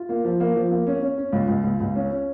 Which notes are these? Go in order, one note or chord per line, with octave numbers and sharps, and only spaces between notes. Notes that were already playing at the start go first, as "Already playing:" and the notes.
Already playing: F4
A#3
F3
A#3
F3
A#3
C#4
C#4
C#4
C#2
C#2
C#2
C#2
C#4
C#4